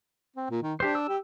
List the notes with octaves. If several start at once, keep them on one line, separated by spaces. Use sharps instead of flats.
C4
A#2
D#3
D4 G4 C5
E6
G4